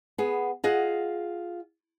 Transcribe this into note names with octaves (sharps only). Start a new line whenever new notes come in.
B3 G#4
F4 G#4 D#5 F#5